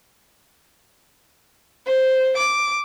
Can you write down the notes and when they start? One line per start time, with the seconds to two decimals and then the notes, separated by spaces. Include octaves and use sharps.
1.87 C5
2.37 D6